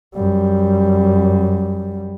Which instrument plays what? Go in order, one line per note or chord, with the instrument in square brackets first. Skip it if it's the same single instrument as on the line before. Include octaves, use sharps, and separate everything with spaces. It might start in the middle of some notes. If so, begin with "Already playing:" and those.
[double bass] F#2 G3